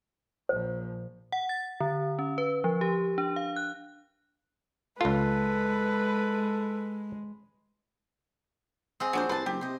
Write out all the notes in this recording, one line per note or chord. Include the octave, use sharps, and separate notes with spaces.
A#1 F3 C5
F#5
A6
D3
C#4
B4
F3
G4
D4
F5
F#6
C#2 G#3 F4 A4 B4
C4 G#4 D#5 F5
A#1 F#3 D4 G#4 C5
C2 B4 C5 A5
F#1 G4
C3 C5 D#5